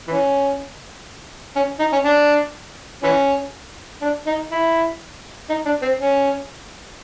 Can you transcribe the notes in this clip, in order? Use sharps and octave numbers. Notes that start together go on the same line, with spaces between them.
E3 C#4
C#4
D#4
C#4
D4
E3 C#4
D4
D#4
E4
D#4
D4
C4
C#4